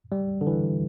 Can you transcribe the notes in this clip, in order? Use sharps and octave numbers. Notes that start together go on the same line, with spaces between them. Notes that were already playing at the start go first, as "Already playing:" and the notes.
G3
D3
E3